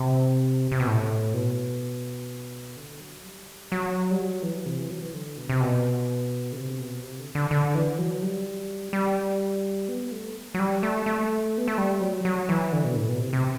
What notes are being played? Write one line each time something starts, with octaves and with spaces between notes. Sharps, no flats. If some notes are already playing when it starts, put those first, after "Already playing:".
Already playing: C3
C3
B2
A2
B2
D3
F#3
G3
F#3
G3
F#3
E3
C3
E3
F#3
E3
D3
B2
C3
B2
D3
C3
B2
C3
D3
D3
D3
E3
F#3
G3
G3
B3
A3
F#3
G3
A3
A3
B3
A3
G3
F#3
F#3
E3
D3
B2
A2
B2
C3
C3